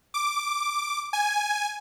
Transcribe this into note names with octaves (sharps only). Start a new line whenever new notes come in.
D6
G#5